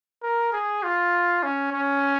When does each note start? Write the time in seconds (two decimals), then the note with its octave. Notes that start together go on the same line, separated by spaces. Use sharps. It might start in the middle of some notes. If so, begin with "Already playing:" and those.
0.23 A#4
0.53 G#4
0.83 F4
1.43 C#4
1.73 C#4